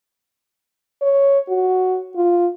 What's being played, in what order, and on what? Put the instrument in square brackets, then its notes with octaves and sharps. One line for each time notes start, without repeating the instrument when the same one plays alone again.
[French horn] C#5
F#4
F4